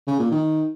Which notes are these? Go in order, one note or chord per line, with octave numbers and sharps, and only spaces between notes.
C#3
A#2
D#3